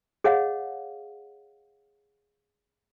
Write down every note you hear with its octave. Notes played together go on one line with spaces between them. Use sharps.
G#4 C#5 D#5 F5 F#5